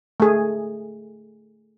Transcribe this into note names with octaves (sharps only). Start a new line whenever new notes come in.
A3 G#4